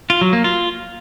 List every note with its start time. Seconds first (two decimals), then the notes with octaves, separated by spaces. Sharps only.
0.10 F4
0.21 F#3
0.33 A#3
0.44 F4